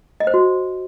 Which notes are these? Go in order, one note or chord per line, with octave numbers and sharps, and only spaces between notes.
D#5
C5
F#4